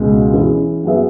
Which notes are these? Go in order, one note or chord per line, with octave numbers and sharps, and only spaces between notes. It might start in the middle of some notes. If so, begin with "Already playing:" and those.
Already playing: C#2 B2 G#3
E3 C#4 E4 G#4
F#3 B3 G#4 E5